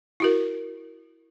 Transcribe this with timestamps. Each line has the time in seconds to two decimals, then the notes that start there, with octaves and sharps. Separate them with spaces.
0.20 E4 F#4 A#4